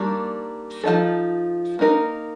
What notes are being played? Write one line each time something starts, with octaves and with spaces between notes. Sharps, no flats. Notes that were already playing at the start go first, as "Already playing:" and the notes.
Already playing: D#3 G3 A#3 D4
F3 A3 D#4 A4
A#3 D#4 A#4